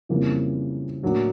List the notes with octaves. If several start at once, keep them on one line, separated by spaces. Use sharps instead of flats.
F2 C#3 E3 G3 A#3
A2 F#3 A#3 D4 F#4